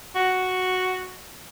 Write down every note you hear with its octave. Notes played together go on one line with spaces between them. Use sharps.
F#4